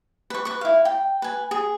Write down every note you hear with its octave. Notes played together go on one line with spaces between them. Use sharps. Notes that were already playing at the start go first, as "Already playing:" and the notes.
B4 C#6
B4 C#6
E4 F5
G5
B4 G#5
G#4